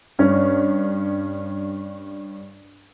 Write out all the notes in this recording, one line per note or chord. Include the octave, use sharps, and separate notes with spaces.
G2 C#4